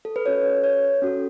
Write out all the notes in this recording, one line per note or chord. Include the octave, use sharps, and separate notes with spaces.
A4
B4
C#4 F#4 A4 C#5
C#5
C#4 F#4 A4